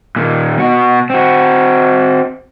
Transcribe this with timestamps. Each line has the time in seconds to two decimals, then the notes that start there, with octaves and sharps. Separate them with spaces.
0.16 A#2 D#3
0.58 B2 F#4
1.10 C4 F#4